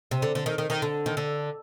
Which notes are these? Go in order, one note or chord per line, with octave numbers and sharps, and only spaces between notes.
C3
D3
D3
D#3
D#3
D#3
D3
D#3
D3